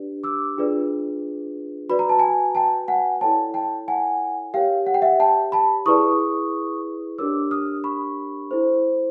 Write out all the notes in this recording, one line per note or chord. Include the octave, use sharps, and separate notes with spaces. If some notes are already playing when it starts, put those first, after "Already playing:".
Already playing: D4 G4 B4 D5
D6 E6
D4 F4 G#4 B4 D5
F#4 B4 D5 B5
A#5
A5
G#5 A#5
G5 A5
F#5 G#5
E4 A4 C#5 G5 A5
G5 A5
F#5 G#5
G4 A#4 C#5 F5 G5
F#5
G5
E5 F#5
G5 A5
A5 B5
E4 G#4 B4 D5 C#6 D#6
D4 G4 A#4 C#5 D6 E6
D#6 F6
B5 C#6
E4 A4 C5